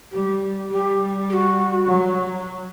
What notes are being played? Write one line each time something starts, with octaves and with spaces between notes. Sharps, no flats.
G3 G4
G3 G4
G4
F#4
F#3